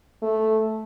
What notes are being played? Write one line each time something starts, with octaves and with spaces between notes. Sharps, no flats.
A3